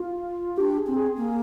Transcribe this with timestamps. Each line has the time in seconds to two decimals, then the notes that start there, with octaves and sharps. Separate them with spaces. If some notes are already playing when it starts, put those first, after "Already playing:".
Already playing: F4
0.57 D4 G4
0.77 G#4
0.87 C4
0.96 G#4
1.15 A#3 G#4